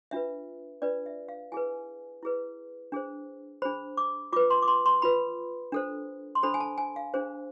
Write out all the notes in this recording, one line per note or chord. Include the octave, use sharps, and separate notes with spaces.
D4 F4 B4 E5
D4 F4 B4 D5
E5
F5
E4 G#4 B4 G#5
E4 G#4 B4
D4 G#4 C5
D4 G#4 C5 B5
D6
F4 B4 D6
C6
D6
C6
C6
F4 B4 B5
D4 A4 C5
C6
D4 A4 C5 B5
G#5
A5
G#5
F5
D4 G#4 C5